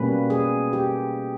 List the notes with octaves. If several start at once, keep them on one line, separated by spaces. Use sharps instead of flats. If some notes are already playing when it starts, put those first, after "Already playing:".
Already playing: B2 G3 A#3 C#4 B4
G#4
G4